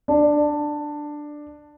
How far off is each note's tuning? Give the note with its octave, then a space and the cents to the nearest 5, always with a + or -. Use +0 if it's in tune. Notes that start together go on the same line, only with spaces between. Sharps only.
D4 +10